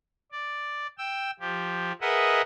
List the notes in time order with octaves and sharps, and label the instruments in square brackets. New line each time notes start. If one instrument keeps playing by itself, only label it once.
[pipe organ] D5
G5 E6
F3 G4
G#4 A#4 B4 D#5 E5 F#5